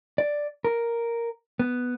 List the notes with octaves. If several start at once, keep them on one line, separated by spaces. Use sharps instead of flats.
D5
A#4
B3